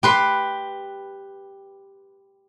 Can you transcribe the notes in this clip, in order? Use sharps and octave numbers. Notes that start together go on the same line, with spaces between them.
G4 B4 C6